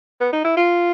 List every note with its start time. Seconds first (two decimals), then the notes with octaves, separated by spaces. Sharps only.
0.21 B3
0.33 D#4
0.44 E4
0.57 F4